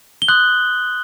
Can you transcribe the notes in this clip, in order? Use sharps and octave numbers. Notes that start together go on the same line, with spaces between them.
G7
C6 D#6 F#6 G6 F#7